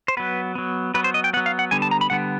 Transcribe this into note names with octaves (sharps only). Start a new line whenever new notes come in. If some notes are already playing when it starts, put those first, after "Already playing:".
C5
F#3 B3 B4
F#3 B3
F#3 B3 B4
C5
D#5
G5
F#3 B3 F#5
F5
F#5
D3 G3 B3 G#5
A5
A#5
B5
D3 G3 B3 F#5